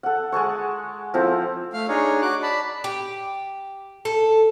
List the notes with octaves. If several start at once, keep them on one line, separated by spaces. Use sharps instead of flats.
A4 F#5
G#3 G#5 A5 C#6
F3 C4 E4 A4
A3 F5 F6
D4 D#4 G#4 C#5
F#4 D6 F#6
D5 A5 B5
G4
A4